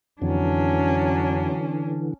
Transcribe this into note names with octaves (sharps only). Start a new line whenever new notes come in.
F2 D3 E3 F#3 C#4 D4